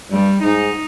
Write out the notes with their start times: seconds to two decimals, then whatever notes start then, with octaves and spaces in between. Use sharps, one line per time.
0.12 G2 G3
0.43 G#2 D#4